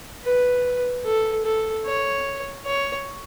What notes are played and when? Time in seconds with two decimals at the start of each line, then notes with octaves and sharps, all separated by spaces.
0.23 B4
1.05 A4
1.45 A4
1.85 C#5
2.65 C#5